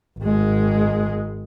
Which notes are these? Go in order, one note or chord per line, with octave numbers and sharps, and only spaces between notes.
G#1 G#3